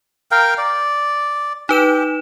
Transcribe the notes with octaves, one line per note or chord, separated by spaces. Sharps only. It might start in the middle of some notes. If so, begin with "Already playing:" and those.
A#4 F5 G5
D5
D#4 G4 B4 E7